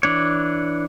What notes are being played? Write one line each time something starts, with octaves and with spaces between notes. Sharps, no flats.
E3 D4 C#5